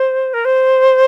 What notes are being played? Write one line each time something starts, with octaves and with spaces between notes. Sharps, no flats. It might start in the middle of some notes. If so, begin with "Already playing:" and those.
Already playing: C5
A#4
C5